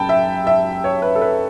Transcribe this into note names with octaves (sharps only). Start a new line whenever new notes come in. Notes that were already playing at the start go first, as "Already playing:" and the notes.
Already playing: F#2 G5 A5 B5
E5
E5
C#5
B4
A4
B4